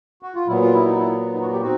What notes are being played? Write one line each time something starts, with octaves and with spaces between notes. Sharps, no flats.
F#4
F4
A#2 F#3 B3 E4
F4
E4
D#4
E4
D#4
F#4
G4
C4 D#4 F#4